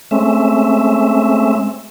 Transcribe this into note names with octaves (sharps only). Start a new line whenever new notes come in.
G#3 A3 C4 C#4 E5